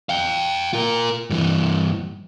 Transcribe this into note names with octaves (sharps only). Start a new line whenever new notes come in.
F5 G5
F4 A#4
G2 E3